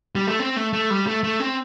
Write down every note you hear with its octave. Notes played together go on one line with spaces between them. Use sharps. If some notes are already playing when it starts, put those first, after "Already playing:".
G3
A3
C4
A3
A3
G3
A3
A3
C4